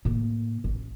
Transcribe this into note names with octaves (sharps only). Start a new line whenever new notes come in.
A2 A#3
A1